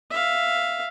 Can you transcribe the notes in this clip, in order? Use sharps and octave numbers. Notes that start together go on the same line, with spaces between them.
E5 F5